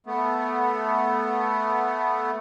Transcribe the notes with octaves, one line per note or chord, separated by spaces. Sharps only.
A3 B3